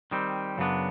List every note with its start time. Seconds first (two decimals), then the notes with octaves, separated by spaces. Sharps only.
0.11 D#3 G3 C4
0.58 F#2 C#3 F#3 B3 D4